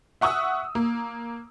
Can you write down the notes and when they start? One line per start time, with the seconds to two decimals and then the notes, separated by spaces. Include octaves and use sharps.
0.21 E5 F#5 C#6 D#6 E6
0.75 A#3